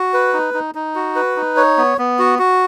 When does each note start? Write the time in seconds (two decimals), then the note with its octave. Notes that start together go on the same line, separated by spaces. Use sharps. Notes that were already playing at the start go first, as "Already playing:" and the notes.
Already playing: F#4
0.13 B4
0.33 D#4
0.54 D#4
0.75 D#4
0.95 F#4
1.16 B4
1.36 D#4
1.56 C#5
1.77 B3
1.98 B3
2.19 F#4
2.39 F#4